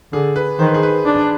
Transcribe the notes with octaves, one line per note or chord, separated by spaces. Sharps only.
D3 G#4
B4
D#3 C5
B4
G#4
B4
D4